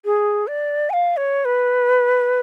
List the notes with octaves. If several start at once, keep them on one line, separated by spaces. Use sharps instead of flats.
G#4
D5
G#5
F5
C#5
B4